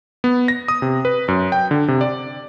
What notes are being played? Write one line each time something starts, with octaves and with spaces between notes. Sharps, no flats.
B3
A#6
D#6
C3
B4
F#2
G5
D3
C3
D5